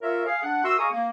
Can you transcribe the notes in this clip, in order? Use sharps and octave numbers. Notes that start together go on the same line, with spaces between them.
F4 A#4 C#5 E5
G#4 F5
D4 F#5
F#4 A#4 E5 C6 E6
G#4 D#5 F5 A#5 C#6 D#6
A#3